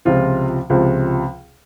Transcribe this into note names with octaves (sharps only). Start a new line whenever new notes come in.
C#2 C3 F3 F4
C#2 C3 F3